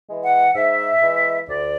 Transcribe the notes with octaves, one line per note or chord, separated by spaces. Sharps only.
E3 G#3
F#5
G#2 E5
E3 G#3
D2 D5